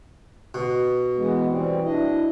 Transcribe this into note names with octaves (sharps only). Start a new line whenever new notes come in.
B2
E3 G#3 B3
E3 G3 C4
D4 E4 D#5